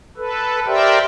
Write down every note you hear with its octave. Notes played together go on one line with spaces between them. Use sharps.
A4 B4
G4 A#4 C5 D5 E5 G5